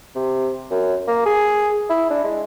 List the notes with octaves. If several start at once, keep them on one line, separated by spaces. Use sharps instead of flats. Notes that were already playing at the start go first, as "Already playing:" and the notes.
C3
F#2
A#3
G#4
E4
D4
G#3